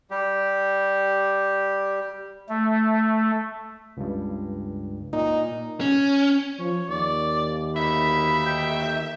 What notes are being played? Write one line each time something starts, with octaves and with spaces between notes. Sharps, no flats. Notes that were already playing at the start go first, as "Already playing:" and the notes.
G3 G4
A3
C#2 G2
A#2 D#4
C#4
F3 C#5
D#2 D5
D2 D#4 E5 B5
G5